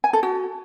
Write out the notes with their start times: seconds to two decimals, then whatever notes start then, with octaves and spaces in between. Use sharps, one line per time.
0.04 G#5
0.13 A4
0.23 F#4